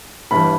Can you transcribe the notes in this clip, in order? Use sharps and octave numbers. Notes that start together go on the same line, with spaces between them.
G1 G2 E3 B5